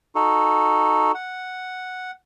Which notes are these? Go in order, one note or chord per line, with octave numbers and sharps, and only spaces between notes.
D#4 F#4 A4
F#5